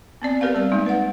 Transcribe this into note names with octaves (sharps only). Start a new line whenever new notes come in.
B3 C4 D5
G4 A#4 B4 F5
G3 C4 B4 D5
G#3 A#3 D#4
B4 F#5